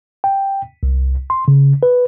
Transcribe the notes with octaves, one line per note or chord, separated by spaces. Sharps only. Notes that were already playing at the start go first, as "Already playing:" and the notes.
G5
C2
C6
C#3
B4